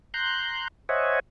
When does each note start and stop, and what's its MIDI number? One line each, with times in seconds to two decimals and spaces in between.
0.14 0.68 82
0.14 0.68 84
0.14 0.68 90
0.14 0.68 91
0.89 1.19 72
0.89 1.19 73
0.89 1.19 75
0.89 1.19 76
0.89 1.19 78
0.89 1.19 80